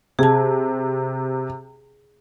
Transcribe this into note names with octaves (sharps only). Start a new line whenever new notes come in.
C3 G#4 A5